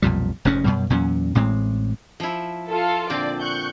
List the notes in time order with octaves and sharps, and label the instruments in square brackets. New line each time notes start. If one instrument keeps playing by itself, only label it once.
[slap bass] B1 F2 A#2 G3
F1 F2 G#2 C#4
F#2 B2 G3
E2 A#2 F#3 C#4
A1 A2 G#3 C4
[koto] F3 E4
[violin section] F4 A4
[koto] A#2 D3 C4 [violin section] D5
[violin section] C#6 F#6 G6